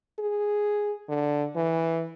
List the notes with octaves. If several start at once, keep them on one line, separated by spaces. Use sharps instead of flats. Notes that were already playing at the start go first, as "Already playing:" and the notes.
G#4
D3
E3